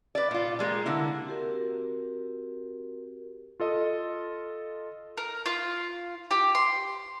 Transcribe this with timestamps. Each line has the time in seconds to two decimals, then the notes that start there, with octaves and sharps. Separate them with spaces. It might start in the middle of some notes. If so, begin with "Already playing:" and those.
0.15 B4 D5
0.31 A#2 F4
0.59 G3 G#3 A#3
0.86 D3 A#3 E4
1.25 C4 F#4 G4 A#4
3.60 F4 A4 D#5
5.17 A#4
5.46 F4
6.31 G4
6.55 C6